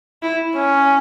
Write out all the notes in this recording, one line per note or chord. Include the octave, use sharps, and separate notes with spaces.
E4
C#4